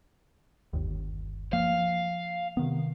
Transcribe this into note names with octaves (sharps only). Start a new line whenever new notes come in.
G1 D#2
F3 A#3 F5
C3 D#3 B3